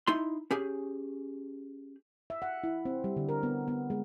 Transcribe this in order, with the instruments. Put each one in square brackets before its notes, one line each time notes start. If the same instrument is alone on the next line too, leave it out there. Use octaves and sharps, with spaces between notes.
[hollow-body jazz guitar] D#4 E4 C6
C#4 G4 G#4
[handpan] E5
F#5
E4
C4
G3
D3
A#4
B3
B3
G#3